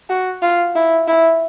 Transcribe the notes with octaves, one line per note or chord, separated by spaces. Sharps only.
F#4
F4
E4
E4